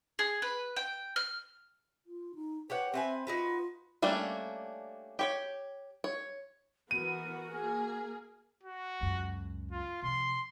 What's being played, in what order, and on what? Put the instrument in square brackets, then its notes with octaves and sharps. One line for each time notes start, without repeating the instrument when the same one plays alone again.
[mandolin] G#4
B4
G5
F6
[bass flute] F4
D#4
[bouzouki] G4 C#5 F#5 [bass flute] B4
[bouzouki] C4 B4 G#5 [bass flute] E5
[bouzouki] D#4 F#4 B4 [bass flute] F4
[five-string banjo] G3 A3 A#3 C#4 D4
G4 C#5 G5
C#5
[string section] E3 B3 [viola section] F#4 [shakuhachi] A#4 [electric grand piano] D#7
[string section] A#3 G#4
[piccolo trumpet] F#4
[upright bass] C#2 F#2
[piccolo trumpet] F4
[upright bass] C3 F3 [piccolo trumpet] C6